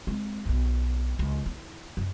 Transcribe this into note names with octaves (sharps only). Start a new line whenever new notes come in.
G#3 C4
D#1 B1
C#2
D#4 E4
F#2